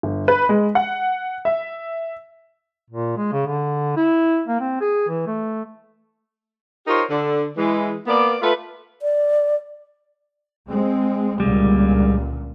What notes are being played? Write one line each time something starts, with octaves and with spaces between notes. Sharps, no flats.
G1
B4
G#3
F#5
E5
A#2
G#3
C#3
D3
E4
A#3
C4
G#4
E3
A3
D#4 F4 G4 A#4 C5 C#5
D3
E3 G#3
A#3 B3 D5
A3 F4 B4
D5
G#3 C4
C#2 A#2 D3 G3 G#3